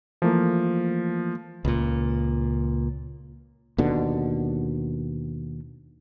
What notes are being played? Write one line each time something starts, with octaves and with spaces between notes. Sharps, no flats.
E3 F3 A3 A#3
C#2 A#2
D#2 B2 D3